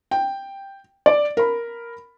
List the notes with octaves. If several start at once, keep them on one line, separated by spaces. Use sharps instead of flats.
G5
D5
A#4 B5